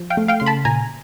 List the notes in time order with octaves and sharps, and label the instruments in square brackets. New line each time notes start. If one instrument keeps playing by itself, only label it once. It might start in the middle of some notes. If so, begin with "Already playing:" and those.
Already playing: [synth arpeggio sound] F3
F5 G5
A3
F5 G5
C#3 C6
A5 B5
A#2 G#5 A#5